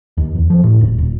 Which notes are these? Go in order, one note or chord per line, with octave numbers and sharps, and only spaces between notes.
D#2
E2
F3
A2
D#1
D#1